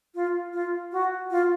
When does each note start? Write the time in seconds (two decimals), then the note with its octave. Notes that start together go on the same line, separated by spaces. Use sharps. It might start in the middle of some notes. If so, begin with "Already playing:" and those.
0.15 F4
0.53 F4
0.92 F#4
1.31 F4